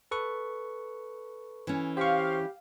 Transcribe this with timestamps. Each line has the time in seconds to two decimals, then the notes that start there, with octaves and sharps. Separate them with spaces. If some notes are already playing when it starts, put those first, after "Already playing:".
0.11 A4 B4 C#6
1.67 E3 C#4
1.97 G4 C5 F5 C#6